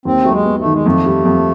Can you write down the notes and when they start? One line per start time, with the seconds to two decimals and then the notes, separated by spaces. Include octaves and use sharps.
0.05 D#2 C4
0.22 F#3 A3
0.31 G#3
0.46 B3
0.59 A3
0.65 D#3
0.73 G#3
0.86 F2 A3
1.06 G3
1.25 F2